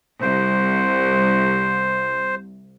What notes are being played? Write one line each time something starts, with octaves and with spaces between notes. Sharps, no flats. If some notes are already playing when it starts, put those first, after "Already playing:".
C2 C5